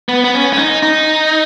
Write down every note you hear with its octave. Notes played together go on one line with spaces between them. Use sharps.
B3
B3
C#4
C#4
D#4
D#4